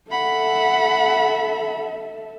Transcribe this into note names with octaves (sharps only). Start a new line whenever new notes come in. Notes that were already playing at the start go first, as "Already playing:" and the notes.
A4 E5 F#5 B5